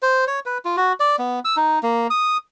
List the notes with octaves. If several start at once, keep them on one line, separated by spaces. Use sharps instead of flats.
C5
C#5
B4
F4
F#4
D5
B3
E6
D#4
A#3
D#6